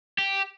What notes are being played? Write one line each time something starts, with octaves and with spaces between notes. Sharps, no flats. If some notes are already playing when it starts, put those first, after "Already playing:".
G4